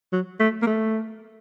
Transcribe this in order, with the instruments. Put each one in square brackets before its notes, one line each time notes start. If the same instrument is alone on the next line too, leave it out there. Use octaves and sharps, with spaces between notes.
[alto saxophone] F#3
A3
A#3
A3